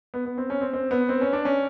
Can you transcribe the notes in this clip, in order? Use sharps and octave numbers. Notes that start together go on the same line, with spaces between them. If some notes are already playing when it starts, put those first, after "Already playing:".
B3
B3
C4
C#4
C4
C4
B3
C4
C#4
D4
C#4